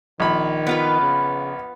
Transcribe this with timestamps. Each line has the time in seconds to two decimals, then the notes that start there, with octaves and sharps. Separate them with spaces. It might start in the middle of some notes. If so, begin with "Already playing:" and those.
0.20 A#1 D#3 B5
0.67 B3 F4 B4
1.01 C#3